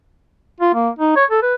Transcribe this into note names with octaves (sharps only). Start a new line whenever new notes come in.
F4
A#3
D#4
C#5
A4
B4